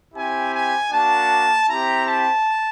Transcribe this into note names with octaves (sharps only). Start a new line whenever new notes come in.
C4 E4 G4 G#5
G#5
A#3 D4 F#4 A5
C4 E4 G4 A#5
A5